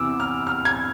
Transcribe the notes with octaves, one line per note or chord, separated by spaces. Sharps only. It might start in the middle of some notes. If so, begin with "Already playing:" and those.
Already playing: E2 C3 E3 D6 E6
F6
F6
G#6